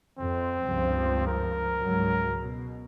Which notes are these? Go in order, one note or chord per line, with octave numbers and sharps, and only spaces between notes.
F2 C4
C#2 G2 F3
A#4
C#2 G#2 F#3
B2